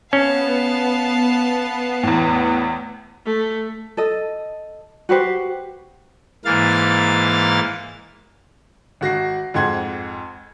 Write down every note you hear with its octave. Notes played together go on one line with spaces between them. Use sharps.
B3 C#4 F5 A5
E2 A2
A3
A4 D#5
F#4 G4 B4 C5
G#2 E3 A#3 F5 A6
G#1 F#4 A#6 C7
F2 G#2 F#5 C6 G#6